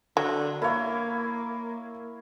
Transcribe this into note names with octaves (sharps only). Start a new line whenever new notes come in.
D3 F#3
A#3 E4 A#4 C#5 F5